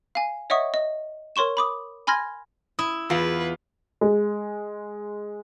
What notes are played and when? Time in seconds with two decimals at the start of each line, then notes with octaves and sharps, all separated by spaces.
0.15 F5 G#5
0.50 C#5 D#5 E5 F#5 C#6 D#6
0.74 D#5
1.36 A#4 C#5 C6 C#6 E7
1.57 B5 D6 D#6
2.07 G#5 B5 C6 F6 G#6 A#6
2.79 E4 D#6
3.10 E2 F4 B4 F5
4.01 G#3